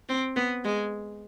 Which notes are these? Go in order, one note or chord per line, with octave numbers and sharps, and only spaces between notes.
C4
B3
G#3